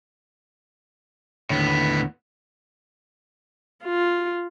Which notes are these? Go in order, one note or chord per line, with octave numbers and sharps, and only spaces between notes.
D#2 A2 D3 B3 C#5
F4